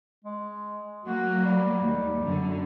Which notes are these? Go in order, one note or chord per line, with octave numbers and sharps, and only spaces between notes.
G#3
F#3 A#3 F#4
G3
D#2
F#2 D3